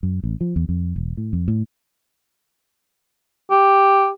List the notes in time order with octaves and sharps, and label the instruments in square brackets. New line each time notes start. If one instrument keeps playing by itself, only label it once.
[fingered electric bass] F#2
A1
F3
E2
F2
E1
A2
F2
A2
[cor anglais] G4